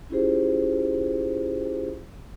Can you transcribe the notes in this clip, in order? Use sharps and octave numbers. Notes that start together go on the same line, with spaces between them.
C#4 E4 F4 G4 G#4 C5